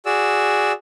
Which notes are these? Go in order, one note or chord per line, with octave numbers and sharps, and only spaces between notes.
F#4 G#4 D5 E6